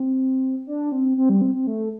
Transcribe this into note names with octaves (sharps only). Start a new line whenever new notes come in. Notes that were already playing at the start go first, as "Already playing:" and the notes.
Already playing: C4
D4
C4
C4
G3
C4
C4
A3